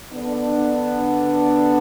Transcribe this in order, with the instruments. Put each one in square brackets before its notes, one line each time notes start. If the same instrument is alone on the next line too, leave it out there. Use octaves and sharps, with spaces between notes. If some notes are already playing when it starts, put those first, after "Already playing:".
[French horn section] D3 B3 D4